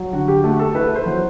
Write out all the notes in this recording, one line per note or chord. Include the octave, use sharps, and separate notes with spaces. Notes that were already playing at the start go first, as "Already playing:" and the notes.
Already playing: F#3
D3 F#4
G4
A3 F#4
A4
E4 B4
C5
F#3